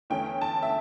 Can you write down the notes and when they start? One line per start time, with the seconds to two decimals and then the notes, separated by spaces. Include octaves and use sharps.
0.10 E2 D3 A3 C#4 G5
0.41 A5
0.63 E5